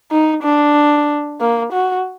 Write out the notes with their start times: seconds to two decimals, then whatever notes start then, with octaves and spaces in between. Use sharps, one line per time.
0.11 D#4
0.43 D4
1.41 A#3
1.73 F#4